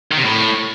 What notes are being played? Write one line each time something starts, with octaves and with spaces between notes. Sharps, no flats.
D#3
C3
A2